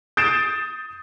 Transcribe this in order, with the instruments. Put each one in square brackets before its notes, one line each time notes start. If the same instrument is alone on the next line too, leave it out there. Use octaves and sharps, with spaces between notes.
[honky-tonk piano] D#6 G6 A6 C7 D7 E7